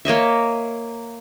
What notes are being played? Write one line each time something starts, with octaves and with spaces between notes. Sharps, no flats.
A#3 C#5 D#5 E5